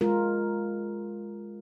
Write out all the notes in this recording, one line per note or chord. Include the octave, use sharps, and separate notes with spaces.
G#3 F4 A#4